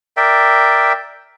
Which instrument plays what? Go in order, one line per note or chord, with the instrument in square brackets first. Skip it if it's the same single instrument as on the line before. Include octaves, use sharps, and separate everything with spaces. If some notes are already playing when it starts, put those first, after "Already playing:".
[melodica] A#4 D5 E5 G5